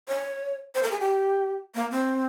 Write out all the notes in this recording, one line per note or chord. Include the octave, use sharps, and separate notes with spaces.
C#5
C5
A#4
G#4
G4
A#3
C4